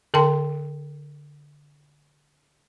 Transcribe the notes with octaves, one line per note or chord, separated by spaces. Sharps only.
D3 A#4 G5 A5 C6